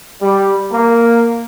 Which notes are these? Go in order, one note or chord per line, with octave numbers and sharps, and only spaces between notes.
G3
A#3